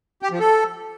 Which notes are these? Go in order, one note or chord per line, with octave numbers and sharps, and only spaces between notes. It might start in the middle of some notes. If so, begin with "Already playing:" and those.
G4
F3
A4